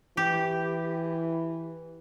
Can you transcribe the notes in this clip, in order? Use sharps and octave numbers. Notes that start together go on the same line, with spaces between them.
E3 G4